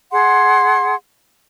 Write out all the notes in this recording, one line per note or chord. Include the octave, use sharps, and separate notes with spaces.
G#4 F#5 C6